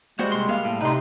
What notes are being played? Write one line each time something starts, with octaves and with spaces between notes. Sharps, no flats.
G3 G#3 A#3 F#4 C5
C2 C6
A#3 F5
A2
C3 D#4 B4 C6